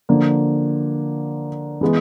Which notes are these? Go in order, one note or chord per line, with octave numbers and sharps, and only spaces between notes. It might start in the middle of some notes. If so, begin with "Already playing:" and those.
D3 F3 A#3
E3 G#3 B3